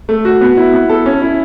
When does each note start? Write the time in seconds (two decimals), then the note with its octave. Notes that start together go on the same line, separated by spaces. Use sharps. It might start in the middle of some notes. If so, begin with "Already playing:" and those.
0.09 A3
0.25 F#4
0.41 B3
0.57 E4
0.73 B3
0.89 A4
1.06 C#4
1.21 E4